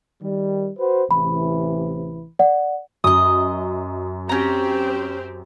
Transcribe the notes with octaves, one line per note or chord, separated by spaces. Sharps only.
D#3 G3
F#4 B4 C5
A1 C3 E3 B5
D5 F#5
F#2 D#5 D#6
C4 C#4 G4 C5 A#5